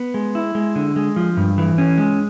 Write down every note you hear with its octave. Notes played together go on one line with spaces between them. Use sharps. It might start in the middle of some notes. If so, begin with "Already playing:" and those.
Already playing: B3
G#3
E4
G#3
D3
G#3
F3
G2
E3
C#4
G#3